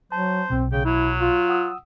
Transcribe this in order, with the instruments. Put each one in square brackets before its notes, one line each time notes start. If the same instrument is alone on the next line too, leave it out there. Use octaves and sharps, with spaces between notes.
[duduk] F#3 [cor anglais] C5 [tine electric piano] A5
[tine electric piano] B1 B2 [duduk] C4
[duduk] C#3 [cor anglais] G5
[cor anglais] F#3 [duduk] E4
[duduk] F4
[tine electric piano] F#5 D#6 E6